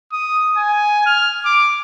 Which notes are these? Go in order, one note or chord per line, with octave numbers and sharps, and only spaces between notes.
D#6
G#5
F6
D6